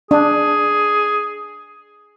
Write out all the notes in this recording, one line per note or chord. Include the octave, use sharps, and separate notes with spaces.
D4 G#4